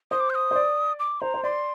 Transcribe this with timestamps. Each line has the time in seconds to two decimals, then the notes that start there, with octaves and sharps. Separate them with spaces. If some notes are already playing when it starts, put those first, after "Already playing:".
0.11 C5 D#6
0.20 D6
0.30 G6
0.35 D#6
0.51 C5
0.55 D5
0.99 D6
1.21 C5 A#5
1.34 C5
1.43 D5 C6